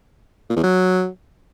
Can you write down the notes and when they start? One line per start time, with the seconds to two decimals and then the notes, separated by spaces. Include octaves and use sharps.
0.49 A#2
0.56 E2
0.63 F#3